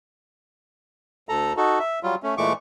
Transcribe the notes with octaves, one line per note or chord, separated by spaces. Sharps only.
D2 A4 A#5
D#4 F#4 A4
E5
F#3 G3 F4
A3 C#4
A#2 E3 G#3 A3 C#6 D6